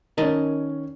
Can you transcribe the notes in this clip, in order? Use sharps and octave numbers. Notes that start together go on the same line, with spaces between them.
D#3 C#4 A#4 D#5 A5